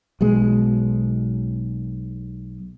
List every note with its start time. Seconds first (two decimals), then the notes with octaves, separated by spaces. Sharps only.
0.21 B1 B2 G#3